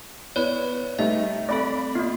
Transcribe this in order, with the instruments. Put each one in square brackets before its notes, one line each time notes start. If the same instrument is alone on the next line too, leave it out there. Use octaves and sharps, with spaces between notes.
[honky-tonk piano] B3 E4 [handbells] C#5 D5 B5
[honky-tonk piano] G3 A3 D#4 [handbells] E5
[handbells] A3 C4 A4 [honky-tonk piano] D5 B5
[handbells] A#3 B3 [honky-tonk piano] F4